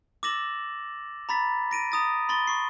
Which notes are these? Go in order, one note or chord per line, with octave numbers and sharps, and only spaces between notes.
D6 E6 A6 A#6 E7 F#7
A#5 B5 A6 B6
A#6 D7 D#7
A#5 D#6 A6
B5 C6 A6 G7
C#6 C7